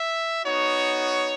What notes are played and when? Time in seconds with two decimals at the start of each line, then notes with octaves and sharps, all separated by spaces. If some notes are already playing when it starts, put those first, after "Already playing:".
Already playing: E5
0.45 B3 D#4 F#4 C#5